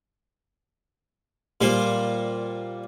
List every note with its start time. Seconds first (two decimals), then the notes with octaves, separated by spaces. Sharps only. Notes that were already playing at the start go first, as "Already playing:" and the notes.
1.61 A#2 G3 A#3 C5